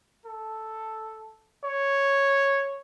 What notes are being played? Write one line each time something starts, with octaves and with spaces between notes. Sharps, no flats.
A4
C#5